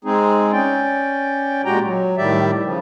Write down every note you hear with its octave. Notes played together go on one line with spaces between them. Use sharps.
G#3 C4 D#4 G#4
C#4 D5 G5
A#2 G#3 F#4 G4 G5 A#5
F#3
A2 D#3 G3 G4 D5 E5
C#3 F3